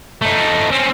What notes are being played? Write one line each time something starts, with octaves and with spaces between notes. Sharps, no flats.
A3 D#4
C4 C#4